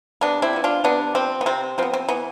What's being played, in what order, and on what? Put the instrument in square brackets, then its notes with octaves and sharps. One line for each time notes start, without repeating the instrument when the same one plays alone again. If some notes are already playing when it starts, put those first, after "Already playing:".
[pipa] C3 B3 D4
C4 E4
F3 B3
D4 F4
C3 B3 D4
F3 B3 C4
B3
C3 C4
F3 B3 C4
C4
E3 B3